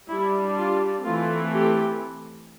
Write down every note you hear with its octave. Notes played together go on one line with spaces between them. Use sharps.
G3 D4 E4
F4
E3 A3 C4 F4
G4